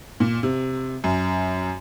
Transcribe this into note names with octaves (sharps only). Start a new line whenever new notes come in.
A#2
C3
F#2